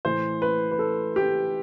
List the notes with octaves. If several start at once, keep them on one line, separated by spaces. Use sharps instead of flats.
A2 E3 C5
B4
B4
A4
G4